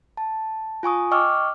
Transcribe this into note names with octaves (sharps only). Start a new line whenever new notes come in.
A5
F4 G#5 C#6 D#6
D#5 G5 C#6 D6 E6 F6